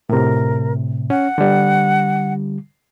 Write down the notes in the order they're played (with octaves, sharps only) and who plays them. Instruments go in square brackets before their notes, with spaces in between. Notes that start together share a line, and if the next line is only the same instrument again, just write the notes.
[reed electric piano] A2 C3 [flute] A#4
[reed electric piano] C#4 [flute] F#5
[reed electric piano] D3 G3